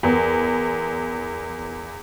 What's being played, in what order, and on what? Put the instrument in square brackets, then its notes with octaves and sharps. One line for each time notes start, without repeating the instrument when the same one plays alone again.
[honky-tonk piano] E2 [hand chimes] A#4 B4 G5